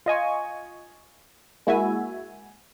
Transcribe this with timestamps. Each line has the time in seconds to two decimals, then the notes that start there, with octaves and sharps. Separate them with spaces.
0.06 F4 D#5 G#5 C#6
1.67 G#3 A#3 E4 F#4 E5 G#5